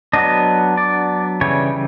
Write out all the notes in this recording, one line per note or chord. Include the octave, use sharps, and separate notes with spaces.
F#3 B3 D4 D#5
D5
C#3 E3 G3 C#5